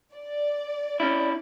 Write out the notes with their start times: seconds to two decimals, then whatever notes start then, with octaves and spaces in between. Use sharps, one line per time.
0.15 D5
1.00 C#4 D4 E4